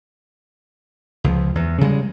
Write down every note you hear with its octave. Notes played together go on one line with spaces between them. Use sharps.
C#2 F3
E2
C#3 G3 G#3